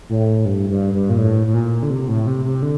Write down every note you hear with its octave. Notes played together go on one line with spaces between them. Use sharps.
A2
G2
G2
G2
A#2
A2
A2
A#2
D3
C3
A2
C3
C3
D3